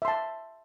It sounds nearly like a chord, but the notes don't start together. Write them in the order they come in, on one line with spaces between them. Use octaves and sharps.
E5 C6 A5